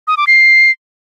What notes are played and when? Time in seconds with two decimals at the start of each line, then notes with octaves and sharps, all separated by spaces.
0.07 D#6
0.17 D6
0.27 C7